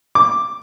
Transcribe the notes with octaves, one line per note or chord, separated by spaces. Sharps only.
D6